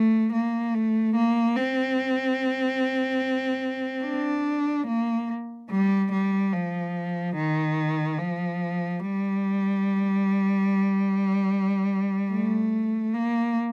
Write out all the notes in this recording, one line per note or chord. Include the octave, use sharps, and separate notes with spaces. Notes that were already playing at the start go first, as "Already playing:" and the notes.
Already playing: A3
A#3
A3
A#3
C4
D4
A#3
G3
G3
F3
D#3
F3
G3
A3
A#3